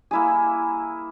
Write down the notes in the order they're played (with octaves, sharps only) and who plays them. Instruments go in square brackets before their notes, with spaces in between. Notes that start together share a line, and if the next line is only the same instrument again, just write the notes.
[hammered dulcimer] A#3 E4 G#4